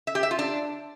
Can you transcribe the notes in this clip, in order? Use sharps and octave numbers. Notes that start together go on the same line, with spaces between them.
E5
G4
E5
F4
D4